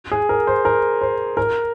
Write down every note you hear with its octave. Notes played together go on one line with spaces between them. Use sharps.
G#4
A#4
C5
A#4
C5
A#4